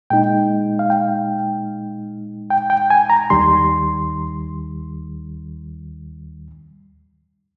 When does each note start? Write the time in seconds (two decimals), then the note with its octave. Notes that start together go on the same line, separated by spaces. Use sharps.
0.10 A#2 G#3 D#4 G5
0.79 F5
0.90 G5
2.50 G5
2.70 G5
2.90 G#5
3.10 A#5
3.30 D#2 D#3 G3 C6